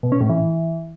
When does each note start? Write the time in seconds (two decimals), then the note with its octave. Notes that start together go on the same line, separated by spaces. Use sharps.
0.03 B2
0.12 C#4
0.21 A2
0.29 E3